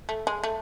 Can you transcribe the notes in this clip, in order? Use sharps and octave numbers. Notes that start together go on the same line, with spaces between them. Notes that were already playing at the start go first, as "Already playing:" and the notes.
A3
G#3
A3